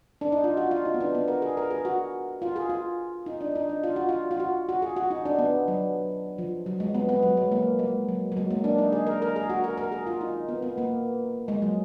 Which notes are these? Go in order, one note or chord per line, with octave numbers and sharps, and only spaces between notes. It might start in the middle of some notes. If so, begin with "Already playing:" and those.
D4
D#4
F4
F#4
F4
D#4
B3
D4
B3
A#4
G#4
A#4
G#4
F#4
F4
G#4
F4
D#4
D4
D#4
D4
F4
F#4
F4
F4
F#4
F#4
G#4
F#4
D#4
D4
B3
F#3
F3
F#3
G#3
B3
B3
F#3
G#3
A#3
G#3
F#3
F#3
G#3
A#3
D4
D#4
G#4
A#4
A#4
G#4
F#4
A#4
A#4
G#4
F4
D#4
B3
B3
A#3
G#3
F#3